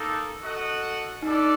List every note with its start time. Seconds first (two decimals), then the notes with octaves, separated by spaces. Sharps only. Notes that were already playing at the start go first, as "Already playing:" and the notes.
Already playing: A#3 D#4 A4
0.42 F#4 A4 D#5 F#5
1.22 G3 D4 D#4 A4 D5